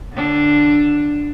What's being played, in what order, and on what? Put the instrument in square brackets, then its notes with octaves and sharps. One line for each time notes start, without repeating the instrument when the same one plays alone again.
[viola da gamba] D3 D4